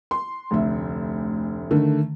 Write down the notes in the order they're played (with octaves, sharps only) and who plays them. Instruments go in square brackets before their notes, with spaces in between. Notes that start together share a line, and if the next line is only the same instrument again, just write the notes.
[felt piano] C6
F1 D2 E5
D3 D#3 A3